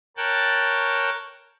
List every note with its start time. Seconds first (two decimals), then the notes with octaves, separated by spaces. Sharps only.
0.17 A#4 C#5 G5 A5 F#6 A6